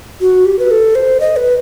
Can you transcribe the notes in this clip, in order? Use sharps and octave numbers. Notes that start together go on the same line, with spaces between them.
F#4
G4
B4
A4
C5
D#5
B4